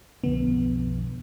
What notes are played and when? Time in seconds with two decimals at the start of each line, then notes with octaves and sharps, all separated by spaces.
0.24 B1 F2 D3 B3